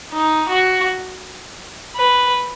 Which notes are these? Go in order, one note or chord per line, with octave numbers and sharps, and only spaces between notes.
D#4
F#4
B4